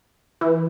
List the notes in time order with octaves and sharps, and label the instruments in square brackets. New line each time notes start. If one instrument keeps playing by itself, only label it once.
[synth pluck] E3